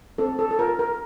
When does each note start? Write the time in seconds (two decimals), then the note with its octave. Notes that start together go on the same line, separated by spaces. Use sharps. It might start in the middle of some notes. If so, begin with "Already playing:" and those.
0.18 C4 A4
0.39 A4
0.51 A4
0.59 F4 A#4
0.79 A#4